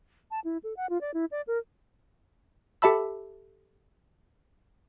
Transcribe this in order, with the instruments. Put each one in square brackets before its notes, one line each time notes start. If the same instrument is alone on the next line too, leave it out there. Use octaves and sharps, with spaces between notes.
[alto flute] A5
E4
A4
F#5
F4
D5
E4
D5
A#4
[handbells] G4 A4 E5 A5 B5 E6